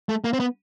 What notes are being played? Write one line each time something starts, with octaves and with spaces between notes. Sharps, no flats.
A3
A#3
C4
B3